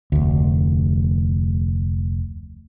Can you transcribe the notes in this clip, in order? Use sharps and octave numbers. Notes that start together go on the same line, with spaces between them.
F1 D2